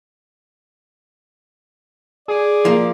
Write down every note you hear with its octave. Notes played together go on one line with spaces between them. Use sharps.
G#4 D5
F3 A#3